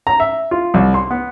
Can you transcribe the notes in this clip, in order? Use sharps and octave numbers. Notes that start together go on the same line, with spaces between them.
A#5
E5
F4
C2
C6
B3